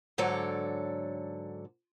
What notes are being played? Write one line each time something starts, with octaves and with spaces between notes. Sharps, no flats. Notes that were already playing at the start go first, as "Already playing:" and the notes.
G#2 D3 F#3 A4 C#5 D5